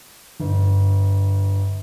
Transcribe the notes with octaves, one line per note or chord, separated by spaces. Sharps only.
G1